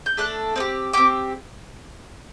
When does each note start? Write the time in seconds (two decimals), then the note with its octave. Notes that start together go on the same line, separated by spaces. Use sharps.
0.06 G6
0.17 A3 D4 A4 F#6
0.56 C4 D#4
0.60 G4
0.93 C4 G4 D6